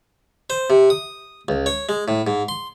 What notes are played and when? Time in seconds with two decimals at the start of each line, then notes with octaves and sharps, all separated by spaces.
0.50 C5
0.70 C3
0.90 D#6
1.48 C#2
1.66 C#5
1.89 G#3
2.08 A2
2.27 G#2
2.49 C6